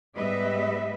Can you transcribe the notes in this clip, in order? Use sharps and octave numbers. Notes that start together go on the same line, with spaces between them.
G#2 G3 B3 B4 D#5 E5